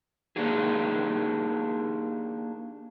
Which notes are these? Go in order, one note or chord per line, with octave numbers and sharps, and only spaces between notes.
A#3 D4 D#4 G4 G#4